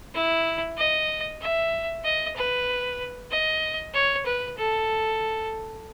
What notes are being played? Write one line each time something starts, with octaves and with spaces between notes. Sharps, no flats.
E4
D#5
E5
D#5
B4
D#5
C#5
B4
A4